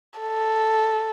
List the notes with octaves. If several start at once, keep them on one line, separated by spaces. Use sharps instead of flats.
A4